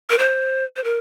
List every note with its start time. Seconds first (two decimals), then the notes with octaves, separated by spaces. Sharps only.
0.10 A#4
0.19 C5
0.76 C5
0.84 A#4